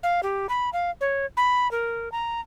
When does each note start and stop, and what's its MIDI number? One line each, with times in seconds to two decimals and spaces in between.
0.03 0.21 77
0.23 0.47 67
0.49 0.70 83
0.73 0.90 77
1.01 1.26 73
1.37 1.70 83
1.71 2.11 70
2.12 2.41 82